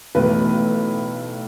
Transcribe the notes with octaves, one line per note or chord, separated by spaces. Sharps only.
B1 A2 E3 B4